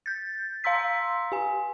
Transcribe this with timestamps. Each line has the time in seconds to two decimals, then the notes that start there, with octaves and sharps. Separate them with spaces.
0.06 G6 A6
0.64 F5 A#5 C6 E6 B6
1.32 G4 G#5